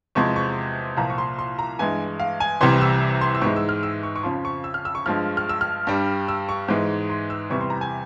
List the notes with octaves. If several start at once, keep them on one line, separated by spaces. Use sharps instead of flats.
E2 C3 F3 G#3 C#6
C#6
C2 A#2 F3 A#5
C#6
C6
C6
A#5
G2 E3 G#3 G#5
F5
G#5
C2 C3 E3 G3 C6
E6
C6
E6
G#2 E3 G#3 C#6
E6
F6
E6
C#6
C#6
F2 C#3 F3 C6
C#6
E6
F6
E6
C#6
G2 F3 G#3 F6
F6
E6
F6
G2 G3
E6
C#6
G#2 E3 G#3
C6
E6
E2 C3 E3 G3 C#6
C6
A#5
G#5